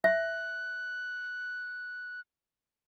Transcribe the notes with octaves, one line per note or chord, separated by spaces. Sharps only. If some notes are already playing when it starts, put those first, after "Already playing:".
E5 F#6